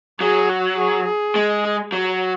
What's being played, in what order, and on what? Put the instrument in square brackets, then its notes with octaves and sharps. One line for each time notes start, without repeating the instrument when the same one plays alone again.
[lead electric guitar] F#3 [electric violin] G#4
[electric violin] F#4
G#4
G#4
[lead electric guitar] G#3
F#3